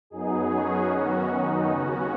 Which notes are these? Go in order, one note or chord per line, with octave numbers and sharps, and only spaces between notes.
F#2 F#3 B3 D#4 G#4
C#4 F#4
F#2 D#3 F#3 B3
D#4
D#2 C#3 B3 C#4 F#4